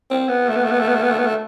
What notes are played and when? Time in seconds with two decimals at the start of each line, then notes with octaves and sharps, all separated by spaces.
0.11 C4
0.29 B3
0.49 A3
0.56 B3
0.64 A3
0.71 B3
0.80 A3
0.88 B3
0.95 A3
1.02 B3
1.11 A3
1.18 B3
1.26 A3